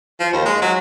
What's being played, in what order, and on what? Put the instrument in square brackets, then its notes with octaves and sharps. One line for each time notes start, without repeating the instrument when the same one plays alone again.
[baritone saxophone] F3
D#2
G#3
F#3